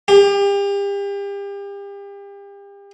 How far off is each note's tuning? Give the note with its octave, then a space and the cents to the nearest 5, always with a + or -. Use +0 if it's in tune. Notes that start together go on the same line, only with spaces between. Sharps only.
G4 +35